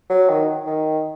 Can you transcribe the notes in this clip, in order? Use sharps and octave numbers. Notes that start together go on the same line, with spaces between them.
F#3
D#3
D#3